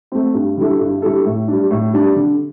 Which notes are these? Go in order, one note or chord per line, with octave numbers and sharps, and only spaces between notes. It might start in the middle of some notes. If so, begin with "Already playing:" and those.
A3 C4
G2
D3 G3 E4 A4
G2
D3 G3 E4 A4
A2
G3 D4
A2
G3 D4
D3